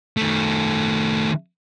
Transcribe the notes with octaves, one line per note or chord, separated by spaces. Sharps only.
D#3 A3